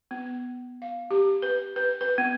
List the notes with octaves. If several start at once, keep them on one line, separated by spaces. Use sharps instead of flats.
B3
F5
G4
B4
B4
B4
B3